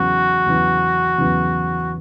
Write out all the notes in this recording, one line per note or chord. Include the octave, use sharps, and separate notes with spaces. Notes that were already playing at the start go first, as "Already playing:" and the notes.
Already playing: E2 C#3 F#3 B3 E4 F#4
E2 C#3 F#3 B3 E4
E2 C#3 F#3 B3 E4